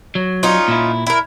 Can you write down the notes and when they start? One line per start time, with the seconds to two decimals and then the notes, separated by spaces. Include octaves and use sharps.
0.15 F#3
0.43 C#4 D#4 F4
0.68 A#2 E4
1.07 E4 A#4